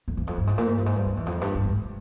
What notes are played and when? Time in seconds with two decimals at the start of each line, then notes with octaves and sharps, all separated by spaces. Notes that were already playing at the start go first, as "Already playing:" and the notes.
0.08 F2
0.17 E2
0.27 F2
0.38 G2
0.47 G#2
0.58 A#2
0.67 G#2
0.77 G2
0.86 G#2
0.96 G2
1.06 F2
1.17 E2
1.26 F2
1.41 G2
1.55 G2
1.65 G#2